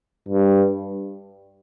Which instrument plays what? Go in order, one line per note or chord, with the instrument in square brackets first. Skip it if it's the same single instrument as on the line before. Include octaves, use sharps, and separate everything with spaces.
[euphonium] G2